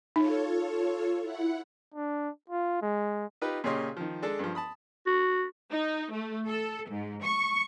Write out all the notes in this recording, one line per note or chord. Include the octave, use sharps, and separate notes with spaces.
D#4 F4 A4 C#5
E4 F#5
D4
F4
G#3
D#4 F4 G4 B4
A#2 C#3 G4 C#5 D#5 C6
D#3 F3
G#3 D4 G#4 A4
G2 F3
A5 B5 D#6
F#4
D#4
A3
A4
G#2
C#6